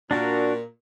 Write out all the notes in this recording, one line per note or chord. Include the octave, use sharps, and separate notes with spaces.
A#2 D4 F#4 A#4